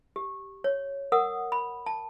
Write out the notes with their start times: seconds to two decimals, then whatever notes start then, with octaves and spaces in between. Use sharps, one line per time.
0.16 G4
0.64 C#5
1.12 A#4 F#5 D#6
1.52 B5
1.86 A5